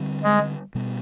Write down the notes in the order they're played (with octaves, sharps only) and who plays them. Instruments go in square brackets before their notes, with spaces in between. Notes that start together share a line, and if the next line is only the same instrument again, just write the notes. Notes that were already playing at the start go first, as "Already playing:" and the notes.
Already playing: [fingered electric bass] D3 G3 C4
[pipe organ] G#3
[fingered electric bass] B2 G3 B3